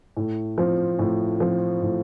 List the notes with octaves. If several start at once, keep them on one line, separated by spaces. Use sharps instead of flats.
A2
F3 C4
A2
F3 C4
A2